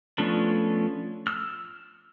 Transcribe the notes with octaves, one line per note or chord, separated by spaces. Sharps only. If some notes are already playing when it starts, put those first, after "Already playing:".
F3 A3 B3 C#4 D4
E6 F6